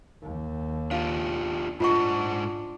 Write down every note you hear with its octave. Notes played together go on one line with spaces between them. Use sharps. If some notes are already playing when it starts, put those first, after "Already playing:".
D#2
D4 F4 G4 F5
G#2 D4 F4 C5 D#5 F#5 C#6